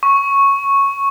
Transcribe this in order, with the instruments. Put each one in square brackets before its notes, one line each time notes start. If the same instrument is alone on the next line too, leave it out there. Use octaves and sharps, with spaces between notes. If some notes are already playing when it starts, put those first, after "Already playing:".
[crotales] C#6